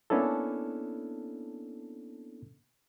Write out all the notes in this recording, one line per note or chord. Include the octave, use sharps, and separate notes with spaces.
A#3 B3 C#4 D4 E4 A4